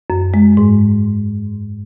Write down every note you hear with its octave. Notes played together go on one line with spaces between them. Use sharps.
F#2
G#3
G#2